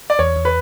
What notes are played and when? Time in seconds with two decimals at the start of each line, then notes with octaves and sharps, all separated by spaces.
0.10 D5
0.19 E2 C#5
0.36 E2
0.45 B4